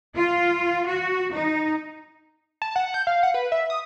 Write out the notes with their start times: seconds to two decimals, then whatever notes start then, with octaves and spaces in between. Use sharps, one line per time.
0.14 F4
0.86 F#4
1.32 D#4
2.62 A5
2.76 F#5
2.94 G6
3.07 F5
3.23 F#5
3.34 B4
3.52 E5
3.70 D#6